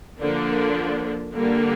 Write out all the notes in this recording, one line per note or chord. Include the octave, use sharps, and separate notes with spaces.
D3 F3 A#3 D4
D3 G3 A#3